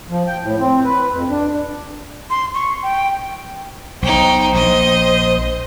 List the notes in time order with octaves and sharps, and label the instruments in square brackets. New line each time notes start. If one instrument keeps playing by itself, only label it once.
[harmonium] F3
G5
A2
C4
B4
F2
D4
[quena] C6
C#6
G5
[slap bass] B1 [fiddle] D#4 G5 [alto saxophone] C5
[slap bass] A#1 [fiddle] D#5